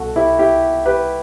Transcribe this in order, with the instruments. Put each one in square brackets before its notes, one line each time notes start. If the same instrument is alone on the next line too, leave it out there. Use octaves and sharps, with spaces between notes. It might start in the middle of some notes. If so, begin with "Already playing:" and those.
Already playing: [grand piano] C2 B2 F#4 A4
E4 G4
E4 G4
G4 B4